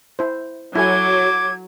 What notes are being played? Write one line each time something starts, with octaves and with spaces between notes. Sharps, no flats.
E4 C5
F#3 E4 A4 G#5 D6 G#6